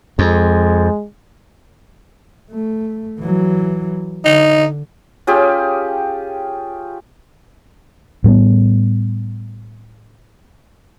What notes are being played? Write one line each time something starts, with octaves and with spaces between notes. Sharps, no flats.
F2 G#3
A3
E3 F#3
D3 D#4
C#4 F4 G4 G#4
A2 G3 G#3 B3